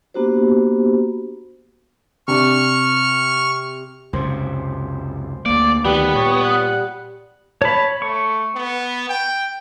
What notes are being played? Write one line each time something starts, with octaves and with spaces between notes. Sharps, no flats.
A#3 B3 D4 F#4 G4 C5
C3 D4 C#6 F6
C#2 F#2 C3 C5
D2 A#3 D5
D2 D#3 G3 B3 B4
A#2 C#5
F#5
C#5 A5 B5
A3 C#6
B3
G5